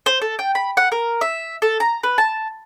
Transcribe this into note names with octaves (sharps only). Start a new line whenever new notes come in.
C5
A4
G5
B5
F#5
A#4
E5
A4
A#5
B4
A5